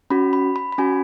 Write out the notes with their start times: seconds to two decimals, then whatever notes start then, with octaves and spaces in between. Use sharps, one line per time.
0.10 C#4 F#4 B5
0.33 B5
0.56 B5
0.72 B5
0.78 C#4 F#4 G#5